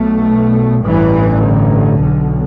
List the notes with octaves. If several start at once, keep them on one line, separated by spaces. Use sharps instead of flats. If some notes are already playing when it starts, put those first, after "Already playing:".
Already playing: B1 B2 A3
A1 G2 E3
D3
B1 B2